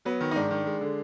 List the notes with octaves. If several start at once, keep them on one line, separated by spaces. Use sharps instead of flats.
F#3 B3
D#3
D#4
G#2 D4
D#3
G#3
D3